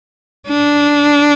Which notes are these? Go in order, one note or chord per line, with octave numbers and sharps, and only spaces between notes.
D4